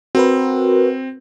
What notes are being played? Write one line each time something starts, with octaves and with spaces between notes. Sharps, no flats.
C4 F#4 A#4 B4